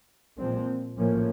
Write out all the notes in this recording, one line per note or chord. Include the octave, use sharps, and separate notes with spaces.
A#2 F3 G#3 C4
A2 F3 A#3 C#4